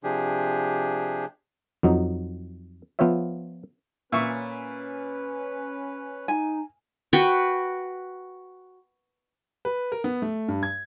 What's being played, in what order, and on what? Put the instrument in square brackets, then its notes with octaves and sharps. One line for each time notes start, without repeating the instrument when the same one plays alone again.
[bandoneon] C3 F3 D4 G4 G#4
[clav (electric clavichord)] F2 F#3 D#4
F3 B3 F4 C5 C#5 E5
[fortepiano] A#2 E5 C#6 [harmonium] C#4 B4
[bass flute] D#4 [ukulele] G#5
[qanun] F#4 B4 G5 C#6
[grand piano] B4
A#4
B3
A3
G2
G#6